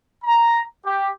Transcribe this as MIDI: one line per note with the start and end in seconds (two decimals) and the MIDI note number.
0.24 0.63 82
0.85 1.10 67